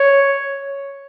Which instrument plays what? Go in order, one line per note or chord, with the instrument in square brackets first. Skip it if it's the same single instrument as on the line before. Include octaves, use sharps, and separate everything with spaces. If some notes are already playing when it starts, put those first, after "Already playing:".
Already playing: [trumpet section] C#5